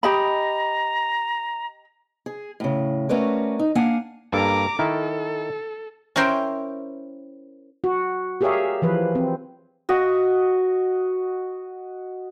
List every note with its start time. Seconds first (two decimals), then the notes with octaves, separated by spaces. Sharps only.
0.03 G4 D#5 A#5 B5
2.26 G#4
2.60 A2 C#3
3.09 A3 C#4 F#4 A#4 B4 D5
3.59 D#4
3.75 A#3 D4 F5 F#5 G#5
4.33 G2 A#3 A4 A#5 D6
4.79 D#3 E4 A4 A#4
6.16 C#4 E4 A#4 C5 G5
7.84 F#4
8.41 G4 G#4 A#4 C#5 E5 F5
8.82 E3 F3 B4
9.15 C4
9.89 F#4 D#5